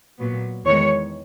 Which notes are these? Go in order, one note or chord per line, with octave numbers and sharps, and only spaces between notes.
A#2 F#3 B3
E2 D#3 G#3 C#5